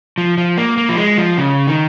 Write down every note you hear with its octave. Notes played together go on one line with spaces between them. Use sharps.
F3
F3
A#3
A#3
F3
G#3
F3
C#3
D#3